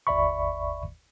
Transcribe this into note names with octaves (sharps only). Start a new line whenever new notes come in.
G1 D#2 D5 E5 B5 C#6